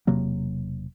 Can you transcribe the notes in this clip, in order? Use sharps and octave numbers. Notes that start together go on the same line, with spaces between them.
E1 C3 F#3 A#3